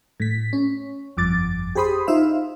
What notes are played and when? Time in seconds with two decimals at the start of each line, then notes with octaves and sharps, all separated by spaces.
0.20 A2 B6
0.53 C#4
1.17 G1 F2 D6 A6
1.75 G4 G#4 C5 B5 C6 D#6
2.07 D#4 F4 C5 E5 F5